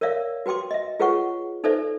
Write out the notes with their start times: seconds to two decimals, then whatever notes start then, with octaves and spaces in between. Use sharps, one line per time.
0.01 A#4 C#5 D5 E5 F5
0.46 F#4 B4 G5 C6 D6
0.71 D#5 E5
1.00 F4 G#4 B4 C#5 F#5 C#6
1.64 D#4 A4 B4 C5 D5 E5